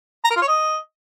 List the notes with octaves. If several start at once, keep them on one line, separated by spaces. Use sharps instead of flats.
A#5
A#4
F4
C#5
D#5